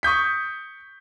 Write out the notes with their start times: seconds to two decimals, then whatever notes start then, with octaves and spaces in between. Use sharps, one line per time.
0.03 C#6 D#6 G6 B6